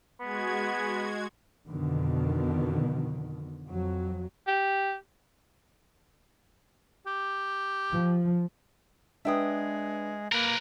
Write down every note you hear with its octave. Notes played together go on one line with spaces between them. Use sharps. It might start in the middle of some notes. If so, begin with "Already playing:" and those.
G#3 B3 F#4 G#6
F2 B2 D3 D#3
F2 F#3
G4
G4
F3
G#3 D4 B4 E5 G5 D#6
A#3 A#4 B4